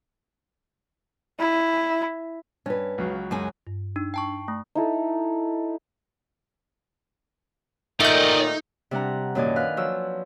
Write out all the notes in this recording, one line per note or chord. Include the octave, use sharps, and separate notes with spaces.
E4
G2 C#4 B4
C#2 F#3 F5
F#2 G#3 G#5
G2
D4 D#4
G5 A5 C#6
A3
D#4 E4 A4
A#2 D#3 A3 D#4 D5 D#5 G6
C3 G3 D4 F#5 A#5
F#2 A#2 D#3 D#4 D5 G#5
B4 F5 F6 F#6
F3 F#3 F4 E6